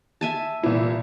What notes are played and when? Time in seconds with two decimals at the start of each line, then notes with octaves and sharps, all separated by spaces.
0.21 E5 G#5 A5
0.63 C2 A#2 E3 E4